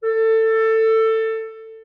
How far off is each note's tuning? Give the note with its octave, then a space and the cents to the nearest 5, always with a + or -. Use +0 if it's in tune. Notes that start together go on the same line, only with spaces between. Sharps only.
A4 +20